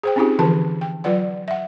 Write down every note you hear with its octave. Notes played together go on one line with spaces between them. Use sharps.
G#4 C5 G5
C4 C#4 D#4 F4 G4 G#4
D3 E3 F3 F4 G#4 A5
G5
F#3 F4 B4 D5 F#5
E5 F#5